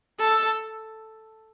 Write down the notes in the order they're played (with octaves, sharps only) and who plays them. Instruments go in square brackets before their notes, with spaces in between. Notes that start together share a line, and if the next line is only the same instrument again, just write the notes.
[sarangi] A4